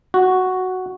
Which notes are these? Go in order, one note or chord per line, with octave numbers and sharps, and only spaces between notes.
F#4